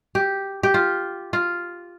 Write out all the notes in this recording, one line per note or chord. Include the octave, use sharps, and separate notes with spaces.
G4
G4
F4
F4